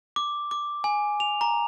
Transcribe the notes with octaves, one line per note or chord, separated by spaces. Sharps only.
D6
D6
G#5
F7
A#5